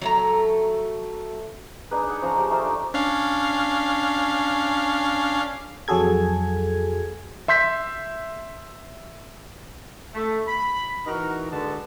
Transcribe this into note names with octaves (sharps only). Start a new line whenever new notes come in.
F#3 A3 A#5
D4 D#4 G#4 B4
G#4 F#5
F3 C#4 C5 A#5
D#4 G4
A3 D#4 F4 C5
D4
C#4 D4 F5
F2 F#3 F#4 G#4 A4 G#6
E5 C6 G6 B6
A3
B5
E3 D#4 F#4 A#4
D3 G#3 F#4 B4 A5